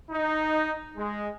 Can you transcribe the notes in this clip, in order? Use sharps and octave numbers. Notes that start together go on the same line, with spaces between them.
D#4
G#3